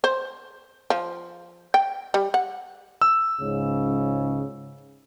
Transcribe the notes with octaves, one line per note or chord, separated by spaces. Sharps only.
C5
F3
G5
G3
F#5
E6
C#2 G#2 C#3